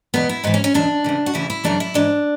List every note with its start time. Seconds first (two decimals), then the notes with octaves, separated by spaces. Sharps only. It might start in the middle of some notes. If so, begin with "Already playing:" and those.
0.14 E2 B2 B3
0.29 E4
0.44 G#2 E3 B3
0.54 C#4
0.64 C#4
0.74 E2 B2 D4
1.04 D2 C#3 E3
1.26 F#4
1.34 D2 C#3 E3 E4
1.50 E4
1.64 F#2 C#3 E3 D4
1.80 E4
1.94 G#2 E3 D4